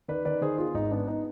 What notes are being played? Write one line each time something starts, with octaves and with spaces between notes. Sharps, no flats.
D#3 B4 D5
D#3 B4 D5
D#3 G#4 C5
B3 F4 G#4
G#1 D#4
B3 D4
B3 D#4